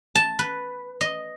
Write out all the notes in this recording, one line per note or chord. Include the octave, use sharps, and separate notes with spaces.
A5
B4
D#5